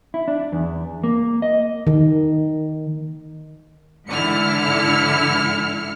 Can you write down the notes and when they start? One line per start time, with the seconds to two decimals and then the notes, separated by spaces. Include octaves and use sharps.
0.14 E4
0.28 D4
0.52 E2
1.03 A#3
1.42 D#5
1.87 D#3
4.07 G#2 D3 E3 E4 F6 C#7